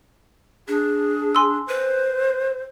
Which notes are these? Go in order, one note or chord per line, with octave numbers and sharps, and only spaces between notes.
D4 G#4
G#5 C6 E6
B4 C5